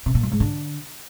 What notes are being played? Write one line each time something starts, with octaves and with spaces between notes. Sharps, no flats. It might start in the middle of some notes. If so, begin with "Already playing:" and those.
C3
A#2
F#2
G#2
D3